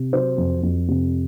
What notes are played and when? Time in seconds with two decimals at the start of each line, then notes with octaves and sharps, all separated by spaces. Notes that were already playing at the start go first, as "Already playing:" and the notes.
Already playing: C3
0.13 F#3 C5
0.38 F2
0.63 F2
0.88 C3